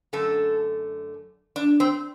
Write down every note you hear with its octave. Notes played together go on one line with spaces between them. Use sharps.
F#2 D3 A3 A4
D4
C4